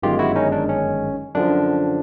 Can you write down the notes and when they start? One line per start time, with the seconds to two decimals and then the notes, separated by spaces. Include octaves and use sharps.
0.03 G1 F#2 D#3 G#3 F4 G4
0.19 E4 F#4
0.36 C#4 D#4
0.52 D4
0.69 C#4
1.35 F#2 D3 F3 D4